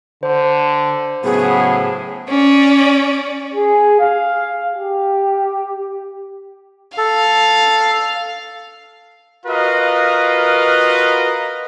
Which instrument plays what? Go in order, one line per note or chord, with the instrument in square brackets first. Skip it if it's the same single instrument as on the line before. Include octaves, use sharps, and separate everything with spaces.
[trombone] D3 [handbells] C5
[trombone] A2 [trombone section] C#3 F#3 B3 [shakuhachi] G#4
[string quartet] C#4 D5
[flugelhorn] G#4
F5
G4
[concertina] A4 [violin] F5
[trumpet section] F4 F#4 A#4 B4 D#5 F5